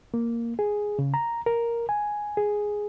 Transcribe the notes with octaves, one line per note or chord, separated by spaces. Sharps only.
A#3
G#4
C#3
A#5
A#4
G#5
G#4